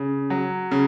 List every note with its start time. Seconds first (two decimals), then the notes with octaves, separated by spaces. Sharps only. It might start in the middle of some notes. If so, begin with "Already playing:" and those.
Already playing: C#3
0.30 F#3
0.71 C#3